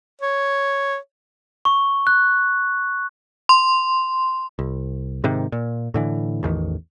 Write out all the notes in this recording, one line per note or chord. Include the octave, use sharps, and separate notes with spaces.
C#5
C#6
F#6
C6
C2
G#2 C3 D#3
A#2
A2 D3 E3
A1 E2 D#3